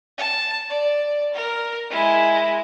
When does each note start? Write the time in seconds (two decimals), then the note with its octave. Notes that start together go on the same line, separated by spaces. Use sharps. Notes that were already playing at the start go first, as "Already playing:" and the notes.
0.18 A5
0.70 D5
1.33 A#4
1.90 G#3 E4